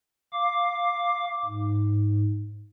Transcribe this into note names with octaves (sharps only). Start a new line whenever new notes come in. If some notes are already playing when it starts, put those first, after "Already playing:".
F5 D6
G#2